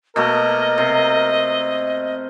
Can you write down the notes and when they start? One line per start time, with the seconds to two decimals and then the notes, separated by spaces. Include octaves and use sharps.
0.16 B2 A3 A#3 A#4 D#5
0.78 C3